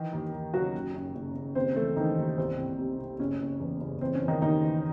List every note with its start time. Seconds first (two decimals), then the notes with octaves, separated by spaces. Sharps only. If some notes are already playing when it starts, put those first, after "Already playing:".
Already playing: D#3 E3 D#4
0.13 D#2
0.33 D#2
0.54 C#3 F#3 F#4
0.74 F#1
0.94 F#2
1.15 F#1
1.36 F#1
1.55 D#2 C4 C5
1.76 E3 A3 A4
1.96 D#3 E3 D#4
2.17 D#2
2.38 C2 C4
2.58 C2
2.79 C3
2.99 C3
3.19 F#1 C#4
3.40 F#1
3.60 E2
3.81 F#1
4.01 E3 C4
4.15 C#4
4.21 E3
4.28 D#3 D#4
4.42 D#2 D#3 D#4
4.62 E3